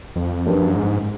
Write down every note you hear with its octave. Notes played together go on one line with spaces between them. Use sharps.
F2
F#2 F3 A#3 D4 G4 B4
G#2